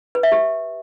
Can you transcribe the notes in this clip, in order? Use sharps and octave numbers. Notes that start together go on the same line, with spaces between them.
B4
E5
G4